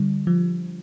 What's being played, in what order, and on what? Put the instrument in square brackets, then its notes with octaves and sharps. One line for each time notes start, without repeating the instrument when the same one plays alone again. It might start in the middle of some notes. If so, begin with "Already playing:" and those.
Already playing: [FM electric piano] D3 G3
F3